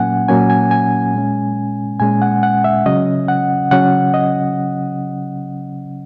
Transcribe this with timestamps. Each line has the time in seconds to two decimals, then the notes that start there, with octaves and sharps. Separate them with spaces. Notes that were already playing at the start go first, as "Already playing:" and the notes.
Already playing: A#2 F#3 A#3 C#4 F#5 G#5
0.28 A#2 F#3 A#3 C#4 G#5
0.50 G#5
0.71 G#5
1.14 A#2 G#3 C#4
2.00 A#2 G#3 C#4 G#5
2.22 F#5
2.43 F#5
2.64 E5
2.86 C#3 F#3 C#4 D#5
3.28 F#5
3.71 C#3 F#3 C#4 F#5
4.14 D#5